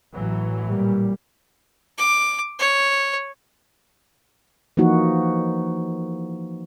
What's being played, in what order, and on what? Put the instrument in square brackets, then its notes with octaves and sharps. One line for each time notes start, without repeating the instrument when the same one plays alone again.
[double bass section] A1 E3 F#3
[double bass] A#2 G3
[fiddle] D6
C#5
[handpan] E3 F3 A#3 D#4 F#4